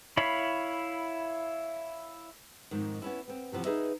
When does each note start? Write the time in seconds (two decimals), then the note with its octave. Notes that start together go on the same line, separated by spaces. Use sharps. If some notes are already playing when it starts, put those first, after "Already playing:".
0.17 E4 C#5 F5 B5
2.71 F2 G#2 D#3
3.02 B3 C#4 E4
3.28 B3 C4
3.52 C3 E3 F3 B3
3.65 D#4 G#4 B4 D#5 E5